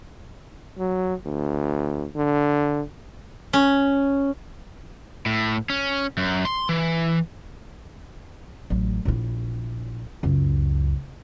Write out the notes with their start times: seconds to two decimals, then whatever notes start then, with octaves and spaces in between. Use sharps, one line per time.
0.78 F#3
1.25 D2
2.16 D3
3.53 C#4
5.26 A2
5.70 C#4
6.18 F#2
6.45 C6
6.69 E3
8.70 A1 F#3
9.05 A#1 E4
10.23 C#2 F#2